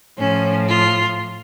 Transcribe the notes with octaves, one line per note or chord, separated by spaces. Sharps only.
A2 F3 C#4
F4